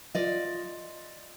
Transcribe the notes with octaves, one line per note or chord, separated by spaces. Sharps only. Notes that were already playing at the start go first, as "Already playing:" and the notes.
F4 D5 D#5